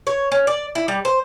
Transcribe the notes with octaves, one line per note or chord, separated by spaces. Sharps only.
C#5
C#4
D5
E4
G3
C5